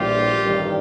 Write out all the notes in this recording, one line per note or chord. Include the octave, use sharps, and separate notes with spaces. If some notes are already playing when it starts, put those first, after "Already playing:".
Already playing: A#1 A2 E3 G3 F4 G4
A1 G2 D#3 G3